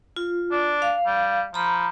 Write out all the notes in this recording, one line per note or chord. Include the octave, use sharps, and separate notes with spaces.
F4
D4
F5
G3
F3 A#5 B5